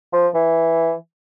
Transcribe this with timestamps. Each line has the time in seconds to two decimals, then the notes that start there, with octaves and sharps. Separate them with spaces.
0.13 F3
0.34 E3